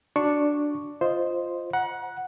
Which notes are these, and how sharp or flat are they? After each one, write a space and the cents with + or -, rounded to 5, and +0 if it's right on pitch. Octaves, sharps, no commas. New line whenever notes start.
D4 +0 F#4 +0 C#6 +0
F4 +0 C5 +0 D#5 +0
F#5 +0 A#5 +40